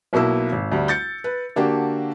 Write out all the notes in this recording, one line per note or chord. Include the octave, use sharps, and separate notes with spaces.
B1 B2 A#3 E4 E6
G#1
D2 G3
G6 A6 C#7
B4
D3 A#3 D4 F#4 G4